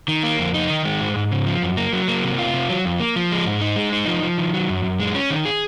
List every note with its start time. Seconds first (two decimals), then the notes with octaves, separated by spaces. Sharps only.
0.08 D#3
0.23 A#3
0.39 F2
0.54 D#4
0.70 D#3
0.85 G#3
1.01 G#2
1.16 G#2
1.31 C#3
1.47 F3
1.62 F#2
1.77 A#3
1.93 F#3
2.08 A#3
2.24 C3
2.39 F4
2.54 C3
2.69 F#3
2.85 F2
3.00 A#3
3.16 F3
3.31 G#3
3.46 G#2
3.61 D#4
3.76 G#3
3.92 D#4
4.07 F3
4.22 F3
4.38 D#3
4.54 F#3
4.69 F#2
4.84 F#2
5.00 G#3
5.15 C#4
5.30 D#3
5.45 G#4